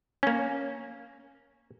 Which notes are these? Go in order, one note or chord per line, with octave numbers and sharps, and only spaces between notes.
A#3 C#4